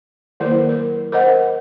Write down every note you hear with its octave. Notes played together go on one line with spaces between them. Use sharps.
D#3 F#3 A#3 E4 A#4 C5
A#4
A#4 C5 D#5 F#5